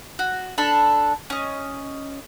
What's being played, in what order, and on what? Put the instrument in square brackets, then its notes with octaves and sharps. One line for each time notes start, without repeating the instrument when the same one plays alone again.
[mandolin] F#4
D4 A4 B5
C#4 D#5